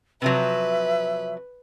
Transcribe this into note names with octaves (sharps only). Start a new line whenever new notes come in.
C3 F3 F#3 B4 E5